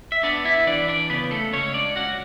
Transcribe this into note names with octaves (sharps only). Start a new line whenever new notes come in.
E5
B3 D4 D5
E4 E5
E3 D4 D5
D4 D5
C#3 B3 B4
A3 A4
C#2 C#4 C#5
D4 D5
C#4 F#4 F#5